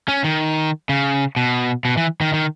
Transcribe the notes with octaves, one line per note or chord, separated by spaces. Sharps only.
C#4
D#3
C#3
B2
B2
E3
D#3
D#3